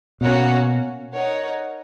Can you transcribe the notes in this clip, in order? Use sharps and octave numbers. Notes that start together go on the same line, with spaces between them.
B2 A#3 C#4 F#4 C#5 F#5
D#4 A#4 C#5 F#5